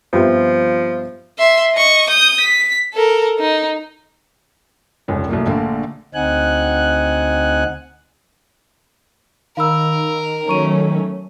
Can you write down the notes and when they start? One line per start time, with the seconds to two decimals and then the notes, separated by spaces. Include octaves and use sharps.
0.13 G2 F3 B3 C4 F4 G4 E5
1.38 E5 C6
1.74 D#5 C#6
2.10 D#6 G6
2.40 B6
2.93 A4 A#4
3.39 D#4
5.08 F1 C#2 C#4
5.29 C2 F#3 A3 A#3
5.46 A#1 D3 A3 A#3 F5 A5
6.14 D2 C4 D#4 F#5 G#5 F#6
9.57 D#3 A#4 F5 B5 E6
10.48 F#3 A3 C#4 A#5 C#6 D#7